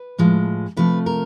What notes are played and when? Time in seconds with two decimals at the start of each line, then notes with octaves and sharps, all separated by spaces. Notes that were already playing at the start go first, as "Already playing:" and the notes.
Already playing: B4
0.18 A2 F3 G#3
0.77 C3 F3 A3 B4
1.06 A#4